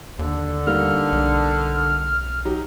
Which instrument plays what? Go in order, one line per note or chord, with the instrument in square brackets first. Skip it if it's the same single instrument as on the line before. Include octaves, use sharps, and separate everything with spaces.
[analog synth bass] D#2 [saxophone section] D3
[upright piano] G3 A#3 D#4 [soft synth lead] F6
[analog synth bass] B1
[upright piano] F#3 D#4 G4